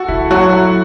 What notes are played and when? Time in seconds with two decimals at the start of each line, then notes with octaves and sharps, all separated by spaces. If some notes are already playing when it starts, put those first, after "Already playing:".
Already playing: F#4 A4
0.08 E3 E4
0.31 F#3 F#4
0.53 E4